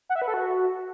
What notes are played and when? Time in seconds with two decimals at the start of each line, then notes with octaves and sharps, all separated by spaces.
0.09 F#5
0.16 E5
0.22 B4
0.28 A4
0.34 F#4